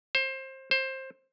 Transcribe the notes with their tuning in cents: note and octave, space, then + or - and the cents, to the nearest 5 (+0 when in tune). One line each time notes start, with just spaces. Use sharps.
C5 +25
C5 +20